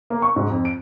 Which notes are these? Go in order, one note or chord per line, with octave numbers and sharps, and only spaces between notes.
A#3
C#6
G#2
F2
D7